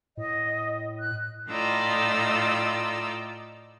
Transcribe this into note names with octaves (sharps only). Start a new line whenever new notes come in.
A2 D#5
F#6
A2 D#4 F4 D5 E6